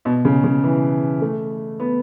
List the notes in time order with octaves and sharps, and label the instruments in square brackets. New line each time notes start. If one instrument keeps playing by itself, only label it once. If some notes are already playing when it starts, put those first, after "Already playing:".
[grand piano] B2
C#3
C#3
E3
A3
B3